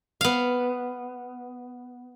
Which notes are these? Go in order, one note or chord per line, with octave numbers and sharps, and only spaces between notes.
B3 F5